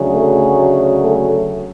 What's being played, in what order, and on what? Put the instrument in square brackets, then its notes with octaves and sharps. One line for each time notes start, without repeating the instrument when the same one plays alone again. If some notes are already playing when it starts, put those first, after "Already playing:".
Already playing: [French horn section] D2 C#3 F#3
A3
A3